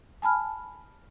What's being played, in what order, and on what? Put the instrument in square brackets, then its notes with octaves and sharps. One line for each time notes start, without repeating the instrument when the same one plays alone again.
[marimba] G#5 A5 B5 F6